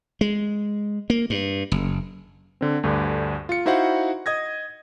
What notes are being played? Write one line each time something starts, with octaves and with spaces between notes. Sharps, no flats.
G#3
A#3
G2
F#1
D3 C4
D2 G2 D3
F4 C#7
D#4 E4 F#4 C5 F5 F#5
D#5 D#6 G#6 A#6